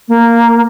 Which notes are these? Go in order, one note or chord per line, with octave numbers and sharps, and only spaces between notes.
A#3